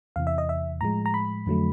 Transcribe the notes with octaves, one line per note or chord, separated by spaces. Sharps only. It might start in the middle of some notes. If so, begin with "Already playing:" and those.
E2 C3 E3 F5
E5
D#5
E5
A2 F3 G#3 A#5
A#5
B5
F2 D3 F#3 A3